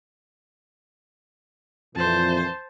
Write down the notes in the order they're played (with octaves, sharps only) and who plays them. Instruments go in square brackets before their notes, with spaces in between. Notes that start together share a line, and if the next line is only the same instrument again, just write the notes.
[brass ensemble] F2 A#2 E3 [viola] C5 A5